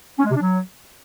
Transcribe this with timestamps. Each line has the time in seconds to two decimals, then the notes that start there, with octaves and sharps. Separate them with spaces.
0.19 C#4
0.24 G#3
0.30 C3
0.35 D4
0.41 F#3